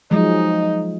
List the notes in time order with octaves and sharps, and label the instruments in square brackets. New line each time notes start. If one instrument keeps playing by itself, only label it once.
[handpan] F3 F#3 G#3 [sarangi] D#4